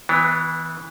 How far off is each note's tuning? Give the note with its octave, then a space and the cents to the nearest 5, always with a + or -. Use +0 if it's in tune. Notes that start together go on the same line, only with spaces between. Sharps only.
E3 -25 B3 +10